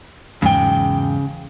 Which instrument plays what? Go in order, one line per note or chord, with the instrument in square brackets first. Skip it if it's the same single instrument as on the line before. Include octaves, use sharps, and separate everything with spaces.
[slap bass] E2 G#2 F#3 [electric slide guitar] C#3 G5